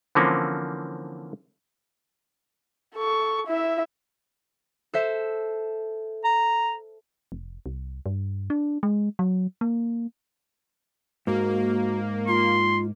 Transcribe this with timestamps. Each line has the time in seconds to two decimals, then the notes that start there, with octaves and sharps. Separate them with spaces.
0.15 D3 E3 F3 A#3 C4 C#4
2.95 A4 C#6
3.47 E4 E5
4.93 A4 C5 E5
6.25 A#5
7.32 F1
7.66 C2
8.06 G2
8.50 D4
8.83 G#3
9.19 F#3
9.61 A#3
11.27 G#2 A#3 F#4
12.28 F4 C6